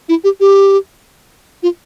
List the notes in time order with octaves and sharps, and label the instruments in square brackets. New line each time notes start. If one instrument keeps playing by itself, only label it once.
[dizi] E4
G4
G4
F4